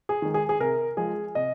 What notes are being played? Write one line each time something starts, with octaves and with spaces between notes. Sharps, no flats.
G#4
D#3 G#3
G#4
G#4
C3 A#4
F3 G#3 G#4
C3 D#5